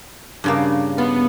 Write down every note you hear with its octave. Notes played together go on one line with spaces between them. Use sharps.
G2 C#3 A#3
B3 F4